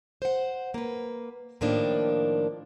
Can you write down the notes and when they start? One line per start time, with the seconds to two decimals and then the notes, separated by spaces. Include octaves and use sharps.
0.22 C5 F#5
0.74 A#3 B4
1.61 A2 D#3 F3 A#3 D4